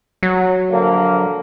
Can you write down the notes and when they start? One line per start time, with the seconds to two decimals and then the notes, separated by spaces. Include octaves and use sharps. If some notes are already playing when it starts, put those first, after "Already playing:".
0.23 F#3
0.70 A#1 D3 A#3